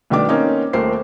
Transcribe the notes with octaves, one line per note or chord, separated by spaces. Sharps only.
C2 B2 D#3 A3 D4 D6
A#3 C4 C#4 D#4
D#1 A3 A#4 C5 C7